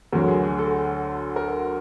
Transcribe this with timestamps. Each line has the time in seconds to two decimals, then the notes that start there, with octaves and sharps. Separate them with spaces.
0.12 D2 D3 F#3 A#4
0.28 G#4
0.43 G#4
0.58 A4
1.36 A#4